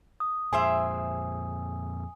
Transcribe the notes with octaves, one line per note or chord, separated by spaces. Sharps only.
D#6
F2 A#2 G#4 C5 E5 G#5